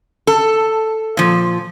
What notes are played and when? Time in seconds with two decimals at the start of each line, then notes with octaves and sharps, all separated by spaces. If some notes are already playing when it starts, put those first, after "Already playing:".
0.27 A4
1.17 A#2 F3